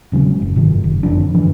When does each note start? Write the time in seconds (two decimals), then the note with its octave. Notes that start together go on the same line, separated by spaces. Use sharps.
0.12 E1 C#3 F#3 G#3
0.42 F#1
0.56 G#2 C3 D#3
0.84 F#1
1.03 F2 D3 F3 D4
1.34 G2 D3 E3 F3